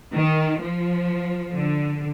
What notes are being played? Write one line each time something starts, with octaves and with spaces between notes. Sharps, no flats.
D#3
F3
D3